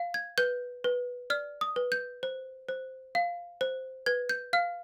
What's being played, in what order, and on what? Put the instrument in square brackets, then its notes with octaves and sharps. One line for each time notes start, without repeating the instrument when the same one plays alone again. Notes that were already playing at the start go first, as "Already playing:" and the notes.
Already playing: [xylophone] F5
G#6
B4 G6
B4
D5 F6
D#6
B4
G6
C5
C5
F5
C5
B4 G#6
G6
F5 F6